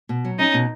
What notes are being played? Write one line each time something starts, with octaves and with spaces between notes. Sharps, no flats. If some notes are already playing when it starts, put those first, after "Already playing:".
B2
F#3
C#4 D#4
B2